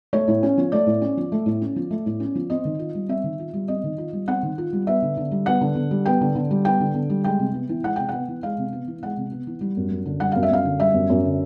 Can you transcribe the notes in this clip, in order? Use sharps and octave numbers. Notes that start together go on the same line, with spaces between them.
A3 C#5
A2
C#4
F3
A3 D5
A2
C#4
F3
A3
A2
C#4
F3
A3
A2
C#4
F3
C4 D#5
D#3
F4
G3
C4 E5
D#3
F4
G3
C4 D#5
D#3
F4
G3
C4 F#5
D#3
F4
G3
B3 E5
D3
D3
G3
B3 F#5
D3
D3
G3
B3 G5
D3
D3
G3
B3 G5
D3
D3
G3
G#3 G5
C3
B3
E3
G#3 F#5
C3 G5
B3 F#5
E3
G#3 F5
C3
B3
E3
G#3 F#5
C3
B3
E3
G3
F#2
F#2
D3
G3 F#5
F#2 F5
E5
F#2 F5
D3
G3 E5
F#2
F#2
D3